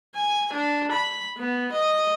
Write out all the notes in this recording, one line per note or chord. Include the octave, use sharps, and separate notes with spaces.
G#5
D4
B5
B3
D#5